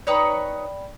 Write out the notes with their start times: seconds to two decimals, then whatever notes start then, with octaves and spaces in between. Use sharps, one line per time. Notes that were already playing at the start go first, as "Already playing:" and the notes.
0.07 D#4 B4 C#5 D5 G5 B5